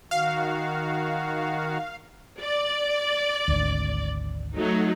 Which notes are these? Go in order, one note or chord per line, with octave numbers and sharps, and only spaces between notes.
D#3 F#4 F5
D5
G#1 D2
F#3 A3 D#4